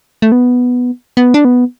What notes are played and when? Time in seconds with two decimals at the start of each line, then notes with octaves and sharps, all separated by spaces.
0.22 A3
0.32 B3
1.17 B3
1.34 D4
1.45 B3